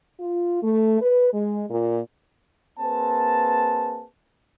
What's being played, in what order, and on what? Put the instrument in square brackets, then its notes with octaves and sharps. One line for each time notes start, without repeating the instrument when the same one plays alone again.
[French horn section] F4
A3
B4
G#3
A#2
[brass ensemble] A#3 C4 G#4 B4 A5